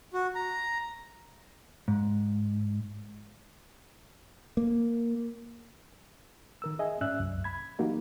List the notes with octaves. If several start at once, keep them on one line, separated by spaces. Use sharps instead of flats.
F#4
A#5
G#2
A#3
D#3 A#4 E6
G#4 D#5 E5 G#5
G#2 C#4 D5 E5 E6 F#6
C2 F#2
B5 G#6
E3 F#3 A#3 D#4 F#4 G4